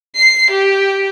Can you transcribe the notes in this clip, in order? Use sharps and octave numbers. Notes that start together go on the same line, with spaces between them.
C7
G4